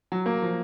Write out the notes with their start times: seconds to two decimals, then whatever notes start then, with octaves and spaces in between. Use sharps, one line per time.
0.12 F#3
0.26 A#3
0.42 F3